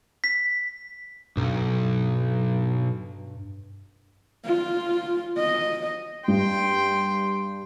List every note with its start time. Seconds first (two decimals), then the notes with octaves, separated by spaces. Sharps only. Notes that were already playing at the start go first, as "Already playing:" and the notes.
0.24 B6
1.37 B1 G2
4.45 F4
5.38 D#5
6.28 G2 G5 C6